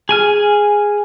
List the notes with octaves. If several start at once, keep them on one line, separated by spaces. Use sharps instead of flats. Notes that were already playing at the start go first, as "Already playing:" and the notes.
G#4 G#5 F6